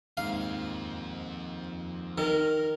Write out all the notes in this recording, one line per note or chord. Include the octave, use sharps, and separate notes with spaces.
D#2 G#2 F3 C4 F5
D#3 A#4